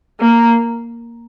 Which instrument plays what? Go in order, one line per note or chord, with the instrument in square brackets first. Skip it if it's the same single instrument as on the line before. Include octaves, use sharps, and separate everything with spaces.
[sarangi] A#3